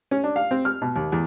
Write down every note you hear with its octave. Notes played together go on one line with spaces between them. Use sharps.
C#4
D4
F5
C4
F6
B2
D#2
E2